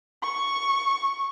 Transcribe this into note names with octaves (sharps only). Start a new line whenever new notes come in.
C#6